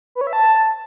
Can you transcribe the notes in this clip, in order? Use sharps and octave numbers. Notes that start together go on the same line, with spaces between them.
B4
C#5
E5
A5